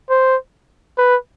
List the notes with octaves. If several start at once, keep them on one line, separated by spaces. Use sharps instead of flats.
C5
B4